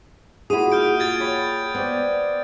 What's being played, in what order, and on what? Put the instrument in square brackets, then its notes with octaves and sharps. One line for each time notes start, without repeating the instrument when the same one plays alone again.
[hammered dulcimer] A#2 F#4 B5 [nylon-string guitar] E4 G#4 [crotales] D#6 D#7
[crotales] F6 G6 D7
[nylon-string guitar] F4 G#4 [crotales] G#6 A6 D7
[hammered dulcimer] C#5 G5 B5
[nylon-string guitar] B3 [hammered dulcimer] C5 D5 G5